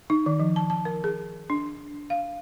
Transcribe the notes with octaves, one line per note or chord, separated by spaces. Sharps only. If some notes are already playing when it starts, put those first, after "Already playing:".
D#4
D#3
F3
A5
A5
A#4
G#4
D4
F5